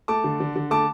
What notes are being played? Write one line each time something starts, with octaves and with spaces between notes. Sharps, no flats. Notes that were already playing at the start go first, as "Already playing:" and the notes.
A3 A5 D6
D3
D3
D3
A3 A5 D6